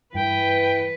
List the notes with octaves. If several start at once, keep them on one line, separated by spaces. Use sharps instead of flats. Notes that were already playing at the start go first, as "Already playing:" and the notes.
G2 E3 B4 G5